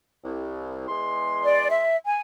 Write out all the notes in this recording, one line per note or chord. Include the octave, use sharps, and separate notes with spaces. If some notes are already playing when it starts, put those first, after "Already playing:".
C2
E2 G#3 C6
D5
E5
G#5